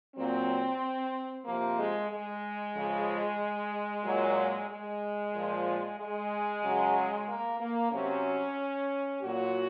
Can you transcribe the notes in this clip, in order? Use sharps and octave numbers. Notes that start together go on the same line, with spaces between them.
A#2 F#3 C4
C3 F3 A#3
G#3
G#3
C#3 F3
A#2 F#3
G#3
A#2 F3
G#3
C#3 F#3
A#3
A#3
C3 F#3 C#4
A#2 F#3 F#4